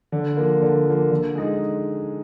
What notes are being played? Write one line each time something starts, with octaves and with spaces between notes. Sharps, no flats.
D3
F3 A#3
D3
F3 A#3
D3
G#3 D#4 G#4